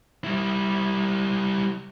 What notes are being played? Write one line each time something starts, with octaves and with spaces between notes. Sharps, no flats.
G3 E4